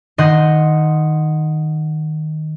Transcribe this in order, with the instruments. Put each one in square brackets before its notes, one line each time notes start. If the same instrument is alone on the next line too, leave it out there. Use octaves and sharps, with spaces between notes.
[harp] D#3 D#5 F#5 C6 G6